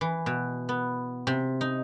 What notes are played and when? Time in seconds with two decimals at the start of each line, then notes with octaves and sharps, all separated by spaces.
0.01 E3
0.26 B2
0.69 B3
1.27 C3
1.61 D#4